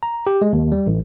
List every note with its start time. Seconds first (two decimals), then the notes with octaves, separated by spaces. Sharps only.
0.03 A#5
0.27 G4
0.41 G#3
0.53 D#2
0.72 G3
0.86 A1